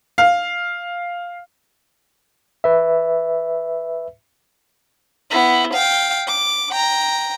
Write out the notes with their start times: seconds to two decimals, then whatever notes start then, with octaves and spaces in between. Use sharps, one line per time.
0.18 F5
2.64 B4 E5
5.31 B3 E4
5.73 F5 G5
6.27 D6
6.71 G5 A#5